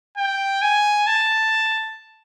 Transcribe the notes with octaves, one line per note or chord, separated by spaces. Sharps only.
G5
G#5
A5